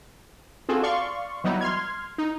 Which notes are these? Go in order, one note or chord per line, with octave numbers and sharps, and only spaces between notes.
C4 F4 F#4 G#4 A4
D5 F5 C6 C#6
E3 F#3 G3 B3 D#4 E4
C6 F6 G#6
D#4